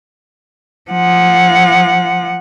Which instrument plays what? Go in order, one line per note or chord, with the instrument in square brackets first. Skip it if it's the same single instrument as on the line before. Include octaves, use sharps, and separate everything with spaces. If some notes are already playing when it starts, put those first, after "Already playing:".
[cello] F3 F#5